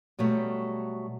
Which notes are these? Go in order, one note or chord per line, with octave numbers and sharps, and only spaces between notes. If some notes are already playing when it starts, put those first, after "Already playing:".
B2 F#3 G3 A3